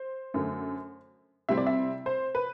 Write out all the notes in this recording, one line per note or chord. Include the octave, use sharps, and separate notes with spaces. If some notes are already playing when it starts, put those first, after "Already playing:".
Already playing: C5
F#2 D3 A3
C3 G3 C4 E4 E5
D5
E5
C5
B4